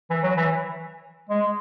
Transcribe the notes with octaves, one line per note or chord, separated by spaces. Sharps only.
E3
F#3
E3
G#3